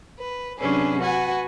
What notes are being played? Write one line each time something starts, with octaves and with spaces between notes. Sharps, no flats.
B4
C3 F#3 C#4 D4 G#4 B4
F#4 B4 F#5 G#5